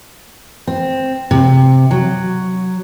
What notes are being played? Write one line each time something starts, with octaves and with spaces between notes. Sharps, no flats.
C4
C3
F#3